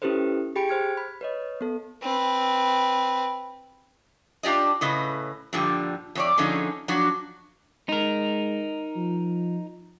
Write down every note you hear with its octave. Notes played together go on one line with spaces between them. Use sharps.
C#4 E4 G4 A4 B4 C5
G4 G#4 G5 B5 C#7 D7
C5 F6 G#6
B5
B4 C#5 D#5
B3 A4
C4 B4
D4 F4 G4 D5 D#5
A2 C#3 B4 D#5
G2 A#2 D3 F3 G3
F2 C#5 D5
D3 F3 C#4 D#4 G#4
F3 F#3 D4 F#4
G#3 D#4 A#4
F3